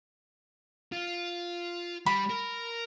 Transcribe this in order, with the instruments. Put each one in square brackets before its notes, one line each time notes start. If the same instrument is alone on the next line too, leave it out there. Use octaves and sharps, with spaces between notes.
[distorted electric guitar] F4
[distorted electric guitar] G3 [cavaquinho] B5
[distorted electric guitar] A#4